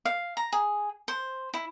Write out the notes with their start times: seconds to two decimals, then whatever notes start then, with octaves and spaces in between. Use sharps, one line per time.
0.05 F5
0.37 A#5
0.52 G#4
1.08 C5
1.54 E4